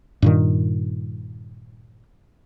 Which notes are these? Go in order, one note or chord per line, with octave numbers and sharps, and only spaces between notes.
G2 A#2 D#3